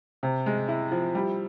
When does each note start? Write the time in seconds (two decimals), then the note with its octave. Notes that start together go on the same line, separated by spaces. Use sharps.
0.23 C3
0.46 G#3
0.68 E4
0.91 F3
1.15 G3